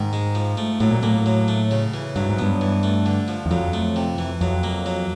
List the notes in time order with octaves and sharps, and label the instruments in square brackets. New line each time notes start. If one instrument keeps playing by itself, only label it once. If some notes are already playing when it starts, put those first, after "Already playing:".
Already playing: [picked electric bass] G#2 [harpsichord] D#3
[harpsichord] G#3
F3
A3
[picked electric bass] A2 [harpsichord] F#3
[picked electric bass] A#2
[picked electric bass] A2 [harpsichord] A#3
[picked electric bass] A2
[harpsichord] F#3
A3
C#3
E3
[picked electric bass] G2 [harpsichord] F#3
[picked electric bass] G#2
[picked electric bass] G2 [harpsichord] B3
[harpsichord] E3
A3
D3
F3
[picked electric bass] E2
[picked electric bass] F2 [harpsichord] F#3
[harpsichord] A3
C3
E3
[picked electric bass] F2 [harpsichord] F#3
[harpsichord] A#3
F#3